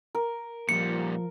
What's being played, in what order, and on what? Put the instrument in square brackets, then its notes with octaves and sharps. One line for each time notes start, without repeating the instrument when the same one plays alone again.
[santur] A#4
[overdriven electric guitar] A#2 G3 [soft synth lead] F3 [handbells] C#7